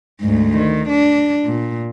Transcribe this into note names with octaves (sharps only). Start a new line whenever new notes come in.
D2 G#2
D#3
D4
A#2